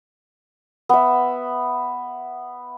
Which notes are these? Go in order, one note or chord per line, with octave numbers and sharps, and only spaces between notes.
B3 E5